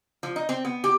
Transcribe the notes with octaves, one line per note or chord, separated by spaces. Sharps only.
F3
D#4
C4
B3
G4